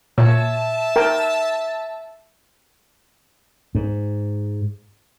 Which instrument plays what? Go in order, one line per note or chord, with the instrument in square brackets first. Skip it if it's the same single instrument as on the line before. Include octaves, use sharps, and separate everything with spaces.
[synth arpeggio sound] A#2 [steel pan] C#5 [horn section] E5 A5
[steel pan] A#4 G5
[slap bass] G#2